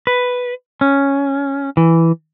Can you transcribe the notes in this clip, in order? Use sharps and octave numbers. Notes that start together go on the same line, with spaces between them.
B4
C#4
E3